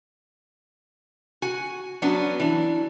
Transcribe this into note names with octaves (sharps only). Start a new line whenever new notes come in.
F#4 G#5
F#3 B3 C#4 D4 F#4
E3 D4